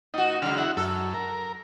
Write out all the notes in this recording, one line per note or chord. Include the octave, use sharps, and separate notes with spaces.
A2 D#4 F#4
C#3 F#3 G#3 F6
E4 F#4 F#5
F#2 A4
A#4